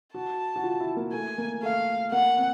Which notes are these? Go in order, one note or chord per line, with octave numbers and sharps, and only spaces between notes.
F#4 A5
F#4
F4
E4
A#3
A3 G#5
A#3
A3 F5
A#3 F#5
C4